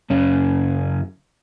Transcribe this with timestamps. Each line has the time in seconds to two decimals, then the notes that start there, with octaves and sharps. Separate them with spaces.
0.10 F#2 C#3 C#4